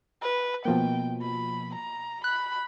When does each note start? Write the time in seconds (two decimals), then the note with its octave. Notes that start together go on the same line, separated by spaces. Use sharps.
0.22 B4
0.65 B2 F3 A#3 G5
1.22 B5
1.75 A#5
2.24 B5 F#6